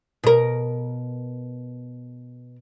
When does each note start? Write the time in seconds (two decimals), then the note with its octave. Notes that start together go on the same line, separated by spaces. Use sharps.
0.23 B2 A#4